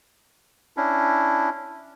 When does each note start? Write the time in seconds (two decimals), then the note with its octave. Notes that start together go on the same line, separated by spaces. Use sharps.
0.77 C#4 D4 E4